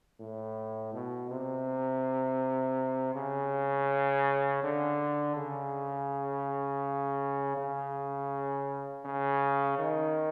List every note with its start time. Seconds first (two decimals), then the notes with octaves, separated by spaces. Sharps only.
0.20 A2
0.94 B2
1.30 C3
3.15 C#3
4.63 D3
5.36 C#3
7.57 C#3
9.05 C#3
9.79 D#3